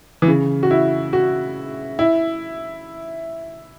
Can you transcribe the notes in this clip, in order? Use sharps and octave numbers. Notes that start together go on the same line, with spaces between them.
E3
C#3
F#4
E4
F#4
E4